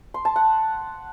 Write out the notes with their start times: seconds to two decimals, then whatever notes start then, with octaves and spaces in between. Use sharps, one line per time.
0.14 C6
0.25 A5
0.36 F#5